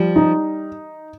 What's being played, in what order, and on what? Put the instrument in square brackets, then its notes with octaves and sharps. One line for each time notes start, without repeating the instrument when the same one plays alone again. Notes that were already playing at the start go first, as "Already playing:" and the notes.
Already playing: [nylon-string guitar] F3 [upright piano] G3
[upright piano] D#4